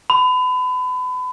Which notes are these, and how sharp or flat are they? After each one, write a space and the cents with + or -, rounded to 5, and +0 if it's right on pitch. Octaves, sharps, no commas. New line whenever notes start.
B5 +30